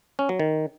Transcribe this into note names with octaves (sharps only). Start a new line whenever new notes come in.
C#4
F#3
D#3